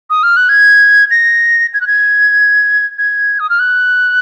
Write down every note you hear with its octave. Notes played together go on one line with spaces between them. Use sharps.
D#6
F6
F#6
G#6
A#6
G#6
F#6
G#6
G#6
D#6
F6
F#6